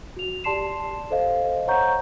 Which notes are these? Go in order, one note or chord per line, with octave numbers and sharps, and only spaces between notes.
F#4 F7
G4 D5 A5 C6 C7 E7
A4 C5 D#5 F5
C5 C#5 F#5 A#5 C#6 G6